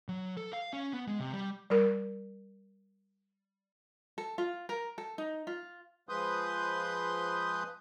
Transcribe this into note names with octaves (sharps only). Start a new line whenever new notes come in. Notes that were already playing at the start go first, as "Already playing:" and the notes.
F#3
A4
F5
C#4
B3
G#3
C3
G3
G3 A#4
A4
F4
A#4
A4
D#4
F4
F3 G#3 B4 C6 D#6 G6